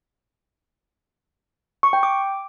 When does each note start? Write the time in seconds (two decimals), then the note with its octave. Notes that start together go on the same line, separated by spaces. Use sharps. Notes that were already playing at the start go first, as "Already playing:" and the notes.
1.83 C#6
1.93 G5
2.03 D6